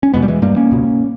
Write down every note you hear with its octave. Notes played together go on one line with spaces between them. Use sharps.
C#4
E2 B2 G#3 B3
G3
E3 G#3
G2 G3 A#3
A#3 C#4
C#2 B2